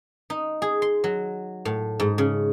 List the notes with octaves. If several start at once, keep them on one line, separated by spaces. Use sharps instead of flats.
D#4
G#4
C6
F#3
A2
G#2
C#3